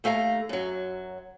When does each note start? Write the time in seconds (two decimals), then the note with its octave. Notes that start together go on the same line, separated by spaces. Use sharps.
0.04 D#2 A3 F5 G#5 A#5
0.49 F#2 F#3